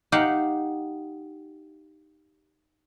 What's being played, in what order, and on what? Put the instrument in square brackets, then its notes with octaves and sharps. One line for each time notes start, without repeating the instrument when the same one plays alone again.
[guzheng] D#4 G4 F5 F#5